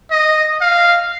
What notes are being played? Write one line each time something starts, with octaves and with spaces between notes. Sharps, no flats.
D#5
F5